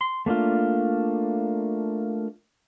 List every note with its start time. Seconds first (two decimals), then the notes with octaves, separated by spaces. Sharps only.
0.01 C6
0.26 A3 A#3 D4 F4